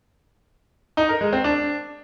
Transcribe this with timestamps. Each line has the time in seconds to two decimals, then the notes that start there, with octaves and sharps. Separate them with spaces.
0.97 D#4
1.09 A#4
1.21 G#3
1.33 C4
1.44 D4